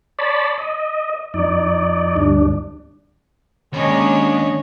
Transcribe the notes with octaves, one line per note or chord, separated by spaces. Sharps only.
C#5 D5 A5 B5
D#5
F2 D#4 D5
D2 G2 D4
D#2 G#3 C#4 D4 C#5 D#5